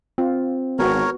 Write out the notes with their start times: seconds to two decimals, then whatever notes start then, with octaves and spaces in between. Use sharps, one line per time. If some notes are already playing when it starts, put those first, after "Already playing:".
0.18 C4 F4
0.79 G#1 B3 F#4 A#4 C#5